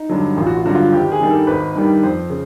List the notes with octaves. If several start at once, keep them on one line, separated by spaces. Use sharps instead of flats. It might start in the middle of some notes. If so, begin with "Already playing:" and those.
Already playing: D#4
G2 D3 F#3
A1 F4
F#4
F4
G2 D3 F#3 F#4
F4
G#1 G4
G#4
G2 D#3 G3
A4
G#1 B4
G2 D#3 G3
F2 C5
C#3